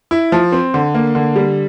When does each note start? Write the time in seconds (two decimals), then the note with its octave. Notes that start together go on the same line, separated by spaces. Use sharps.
0.11 E4
0.32 F3
0.52 C4
0.74 D3
0.94 A#3
1.15 D3
1.36 G3